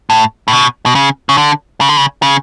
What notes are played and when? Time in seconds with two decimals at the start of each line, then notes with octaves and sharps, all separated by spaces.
0.10 A2
0.48 A2
0.53 B2
0.86 B2
0.95 C#3
1.29 C#3
1.38 D3
1.81 C#3
1.89 D3
1.97 C#3
2.22 C#3